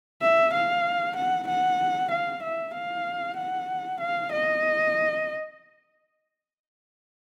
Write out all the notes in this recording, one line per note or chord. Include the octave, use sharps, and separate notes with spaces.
E5
F5
F#5
F#5
F5
E5
F5
F#5
F5
D#5